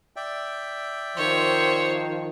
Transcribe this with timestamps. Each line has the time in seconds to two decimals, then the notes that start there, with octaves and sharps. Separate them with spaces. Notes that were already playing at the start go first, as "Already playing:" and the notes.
0.16 D5 E5 G5
1.17 D#3 F3 C5 C#5